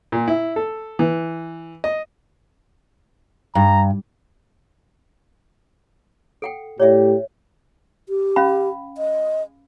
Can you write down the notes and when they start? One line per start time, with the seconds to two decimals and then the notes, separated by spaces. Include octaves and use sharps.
0.12 A#2
0.28 E4
0.56 A4
0.99 E3
1.84 D#5
3.55 G2 A#5
6.42 A4 F#5 G5
6.80 A2 G4 C#5 D5 E5
8.09 G4
8.36 C#4 F5 B5
8.98 D#5